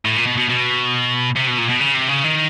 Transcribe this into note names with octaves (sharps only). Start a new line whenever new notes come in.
A2
A#2
B2
B2
B2
C3
B2
A#2
B2
C#3
C3
C#3
D#3